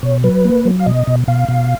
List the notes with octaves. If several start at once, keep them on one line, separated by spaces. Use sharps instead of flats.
B2 C#5
F#3 B4
A#3
F#3
F5
B2 D#5
B2
B2 F5
B2